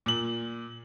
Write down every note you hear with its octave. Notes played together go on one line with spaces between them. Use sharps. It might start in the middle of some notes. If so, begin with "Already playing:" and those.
A#2 F#7